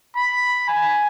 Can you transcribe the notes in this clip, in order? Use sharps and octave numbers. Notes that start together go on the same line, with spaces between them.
B5
G#5